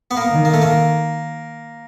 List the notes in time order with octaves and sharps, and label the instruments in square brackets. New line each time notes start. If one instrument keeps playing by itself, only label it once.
[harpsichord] B3
A#3
[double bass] D#3
[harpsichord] A#3
A3
A#3